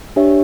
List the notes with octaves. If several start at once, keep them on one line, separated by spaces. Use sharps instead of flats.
D4 G4 C#5 E5